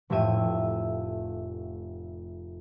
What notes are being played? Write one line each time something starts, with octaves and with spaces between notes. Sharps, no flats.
F1 A2 G4 E5 D#7 E7